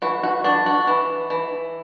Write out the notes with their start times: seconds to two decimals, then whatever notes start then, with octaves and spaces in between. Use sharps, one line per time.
0.02 E3 F#4
0.23 F#4
0.44 D4 F#4
0.66 F#4
0.87 E3
1.30 E3